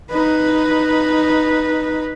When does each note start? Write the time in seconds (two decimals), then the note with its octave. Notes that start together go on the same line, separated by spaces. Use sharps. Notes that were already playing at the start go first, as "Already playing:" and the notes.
0.10 D#4 B4